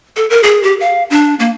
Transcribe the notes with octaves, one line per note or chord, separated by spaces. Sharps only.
A4
A#4
G#4
G4
F5
D4
A#3